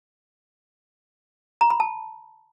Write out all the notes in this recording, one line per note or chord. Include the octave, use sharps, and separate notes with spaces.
A#5
B5
A5